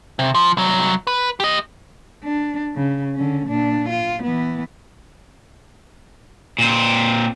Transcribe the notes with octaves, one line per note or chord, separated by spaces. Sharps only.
C3
F3
C2 F#3
B4
G4 D#5
D4
C#3
D3 C#4
A#2 D4
F4
E3 B3
A#2 C4